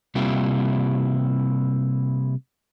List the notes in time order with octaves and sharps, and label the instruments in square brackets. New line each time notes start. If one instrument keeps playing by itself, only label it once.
[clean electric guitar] C3 G3 A#3 E4 F4 G4